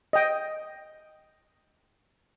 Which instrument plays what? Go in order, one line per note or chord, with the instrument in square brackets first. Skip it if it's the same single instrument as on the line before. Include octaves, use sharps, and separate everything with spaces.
[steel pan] D#5 G5